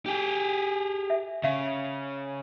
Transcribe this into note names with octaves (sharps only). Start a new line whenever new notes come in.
G4 G#4
E5
C#3 E5 F5 C#6